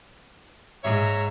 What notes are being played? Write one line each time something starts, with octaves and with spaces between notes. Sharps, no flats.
G#2 C#5 E5 A#5